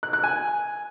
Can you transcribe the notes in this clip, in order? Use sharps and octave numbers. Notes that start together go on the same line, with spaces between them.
F#6
F#6
G#5